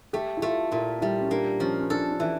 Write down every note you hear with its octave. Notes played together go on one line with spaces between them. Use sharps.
A3 G4
E4
A3 F4
A#2 E4
G3 E4
C#4
A#3 D4
F3 C#4
C#4
D4 A4
D4
E3 E4